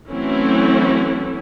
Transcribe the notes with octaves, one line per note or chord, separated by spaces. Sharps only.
E3 F#3 A3 C4 C#4 E4